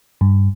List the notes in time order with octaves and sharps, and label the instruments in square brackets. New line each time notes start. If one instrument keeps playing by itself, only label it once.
[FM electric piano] G2